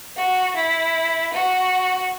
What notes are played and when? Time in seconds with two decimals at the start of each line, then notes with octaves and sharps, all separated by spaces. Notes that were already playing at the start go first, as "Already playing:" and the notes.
0.17 F#4
0.56 E4
1.33 F#4